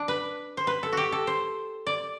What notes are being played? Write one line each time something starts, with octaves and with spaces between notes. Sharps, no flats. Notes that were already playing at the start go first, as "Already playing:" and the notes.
Already playing: D4
B4
C5
B4
A4
F#4 G4
A4
C5
D5